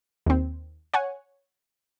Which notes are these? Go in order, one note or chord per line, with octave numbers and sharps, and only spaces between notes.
D#2 C4
C#5 F#5 G#5